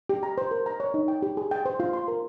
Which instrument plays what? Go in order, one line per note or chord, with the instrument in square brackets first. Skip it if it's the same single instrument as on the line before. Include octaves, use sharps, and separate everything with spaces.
[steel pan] G4
A#5
C5
A#4
A#5
C#5
D#4
G5
G4
G#4
G5
C5
F4
C6
A#4